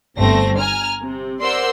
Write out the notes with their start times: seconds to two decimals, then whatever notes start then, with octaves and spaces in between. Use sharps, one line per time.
0.17 G1 G2 A3 C4 A#6
0.58 G#5 A#5 F6
1.03 C3
1.42 A#4 C5 D5 F#5 C6 E6